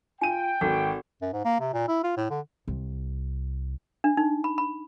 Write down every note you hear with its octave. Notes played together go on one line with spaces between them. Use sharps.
F4 G5 G#5 D#7
G#1 F#4 A4 F#5
F#2
G#2
A#3
C3
A#2
E4
F4
A2
D3
C2
D4
D#4
B5
B5